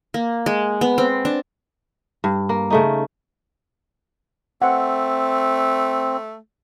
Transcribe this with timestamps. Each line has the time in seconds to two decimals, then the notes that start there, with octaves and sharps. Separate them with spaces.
0.14 A#3
0.46 G#3
0.81 B3
0.98 C4
1.25 D4
2.24 G2
2.49 A#3
2.70 C#3 A3 D#4
4.62 A3 C4 F#5